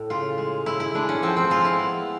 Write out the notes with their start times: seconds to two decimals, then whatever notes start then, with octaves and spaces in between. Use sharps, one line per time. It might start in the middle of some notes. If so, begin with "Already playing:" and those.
Already playing: A2
0.10 C#3 F4
0.38 G#3
0.66 G#3 E4
0.80 E4
0.94 G#3 D4
1.09 C#4
1.23 F3 C4
1.37 C4
1.50 G#3 F4
1.65 E4
1.79 B3